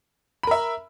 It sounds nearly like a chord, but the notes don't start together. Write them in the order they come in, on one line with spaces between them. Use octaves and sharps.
B5 A#4 E5